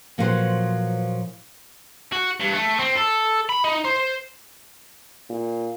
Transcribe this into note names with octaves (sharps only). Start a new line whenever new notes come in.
A#2 F3 F#3 F#4 B4 C5
F#4
G2
A3
C4
A4
B5
D#4
C5
A#2